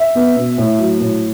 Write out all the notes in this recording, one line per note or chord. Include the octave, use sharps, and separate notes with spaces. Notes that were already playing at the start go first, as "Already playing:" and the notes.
Already playing: E5
B3
B2
A2
F#3
A2